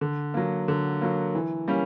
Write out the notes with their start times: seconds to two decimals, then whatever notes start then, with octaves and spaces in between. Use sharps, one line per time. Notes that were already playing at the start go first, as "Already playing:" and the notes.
0.01 D3
0.34 F#3 A#3
0.68 D3
1.01 F#3 A#3
1.35 E3
1.68 G3 A#3 C#4